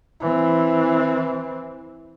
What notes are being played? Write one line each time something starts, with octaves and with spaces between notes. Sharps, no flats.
E3 C4